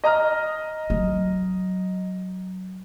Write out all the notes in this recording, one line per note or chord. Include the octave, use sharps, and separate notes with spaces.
D#5 A#5 F6
F#3